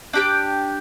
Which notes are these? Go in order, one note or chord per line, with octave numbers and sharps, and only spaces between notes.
D4 G4 D5 G5